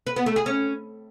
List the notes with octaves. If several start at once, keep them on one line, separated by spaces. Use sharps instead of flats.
B4
B3
A3
G#4
C#4